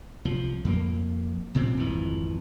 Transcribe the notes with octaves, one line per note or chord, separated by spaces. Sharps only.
C2 F3
F2 A#3
C2 A#2 C#3 C4
G#1 F2 E3